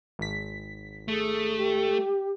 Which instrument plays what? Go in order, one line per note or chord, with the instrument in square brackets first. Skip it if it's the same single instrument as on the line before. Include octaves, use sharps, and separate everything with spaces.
[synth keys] G#1 B6
[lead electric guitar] A3 [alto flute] G#4
[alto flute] G4